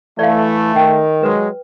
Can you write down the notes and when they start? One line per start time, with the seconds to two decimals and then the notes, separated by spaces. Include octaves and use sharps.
0.19 E3 A3 D5 F5
0.76 D#3 G5 E6
1.23 F#3 G#3 B4